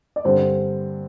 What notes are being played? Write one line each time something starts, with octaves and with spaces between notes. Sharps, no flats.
D5
G2 D3 C4 C5